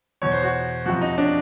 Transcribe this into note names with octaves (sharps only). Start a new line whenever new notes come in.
E2 B2 C#5
C5
F#4
F2 C3 F3 F#4
D#4
D4